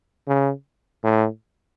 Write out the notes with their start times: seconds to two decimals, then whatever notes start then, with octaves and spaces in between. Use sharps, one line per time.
0.28 C#3
1.04 A2